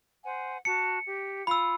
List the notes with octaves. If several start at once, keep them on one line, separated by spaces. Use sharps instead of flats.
C5 F#5 G#5
F#4 A5 C#7
G4
F4 B5 E6